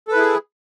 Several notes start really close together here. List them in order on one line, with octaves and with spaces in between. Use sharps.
A4 B4 E4 G#4